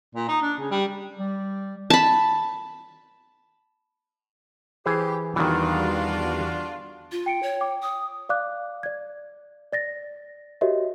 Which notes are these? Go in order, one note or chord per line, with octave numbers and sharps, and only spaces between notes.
A#2
D#4
D4
C#3
G3
G3
A5 B5
E3 G4 G#4 C5
E2 D#3 E3 G3 D4 F4 F#4
F4
G5 C#7 D7
C#5
G5 D6
D#6
D5 F5 D6 F#6
D5 G#6
D5 A6 A#6
F#4 G4 A#4 C#5 D#5 E5